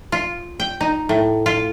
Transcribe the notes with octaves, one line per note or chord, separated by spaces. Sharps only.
F4
G5
D#4
A2
F4